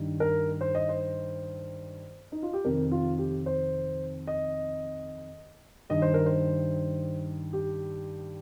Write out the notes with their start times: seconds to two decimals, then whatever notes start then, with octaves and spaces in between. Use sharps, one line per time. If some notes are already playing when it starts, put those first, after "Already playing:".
Already playing: G2 D#3
0.20 A#4
0.61 C5
0.75 D#5
0.89 C5
2.32 D#4
2.42 F4
2.53 G4
2.64 F2 C3 D#3 A#4
2.91 F4
3.18 G4
3.46 C5
4.27 D#5
5.90 G2 D#3 D#5
6.02 C5
6.14 A#4
6.26 C5
7.53 G4